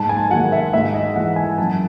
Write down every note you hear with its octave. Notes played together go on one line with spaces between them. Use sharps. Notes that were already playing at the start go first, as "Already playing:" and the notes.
Already playing: G#2 A5
G#5
D#3 F#3 F#5
E5
G#2 E5
D#5
E3 F#5
G#5
F#2 A5